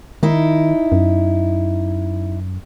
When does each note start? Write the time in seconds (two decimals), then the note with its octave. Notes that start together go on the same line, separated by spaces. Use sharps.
0.23 D#3 D#4 E4
0.92 F#2